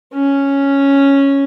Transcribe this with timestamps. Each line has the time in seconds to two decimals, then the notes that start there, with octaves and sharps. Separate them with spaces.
0.14 C#4